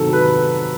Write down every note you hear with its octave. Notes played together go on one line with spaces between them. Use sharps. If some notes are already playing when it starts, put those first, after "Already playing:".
Already playing: C3 D#3 F#3 A4
B4